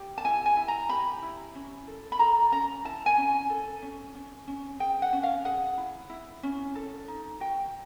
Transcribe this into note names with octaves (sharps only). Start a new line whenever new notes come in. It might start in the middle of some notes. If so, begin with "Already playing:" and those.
Already playing: G4
A5
E4 G#5
G#5
E4
A#5
G4 B5
E4
C#4
A4
B5
A4 A#5
C#4 A#5
E4 A5
G#5
C#4
A4
C#4
C#4
C#4
G#4 G5
F#5
C#4
F5
G#4 F#5
E4
E4
C#4
A4
D#4
F#4 G5